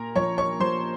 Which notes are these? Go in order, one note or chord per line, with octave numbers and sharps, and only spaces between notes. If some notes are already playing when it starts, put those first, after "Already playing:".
Already playing: A#2 A#4 A#5
F3 C#5 C#6
C#5 C#6
F3 C5 C6